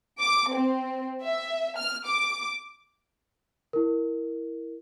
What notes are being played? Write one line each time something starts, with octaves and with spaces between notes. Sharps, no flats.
D6
C4
E5
F6
D6
E4 A#4